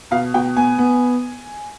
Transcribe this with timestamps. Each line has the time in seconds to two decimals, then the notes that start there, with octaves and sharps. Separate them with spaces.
0.11 B2 F5
0.34 B2 G5
0.56 B3 G#5
0.78 B3